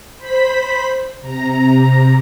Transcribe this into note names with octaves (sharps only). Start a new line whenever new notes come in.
C5 B5 B6
C3 A#5